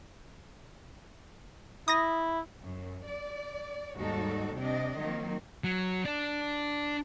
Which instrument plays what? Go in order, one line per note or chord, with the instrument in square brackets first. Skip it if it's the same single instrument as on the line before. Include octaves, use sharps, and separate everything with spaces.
[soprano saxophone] E4 [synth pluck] D#6 A#6
[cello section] F#2
D5
D#2 G#2 G3 D#4 F#4 A4
C3 D4 D5 D#5
D#3 F3 F#3 A#3 C4
[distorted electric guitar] F#3
D4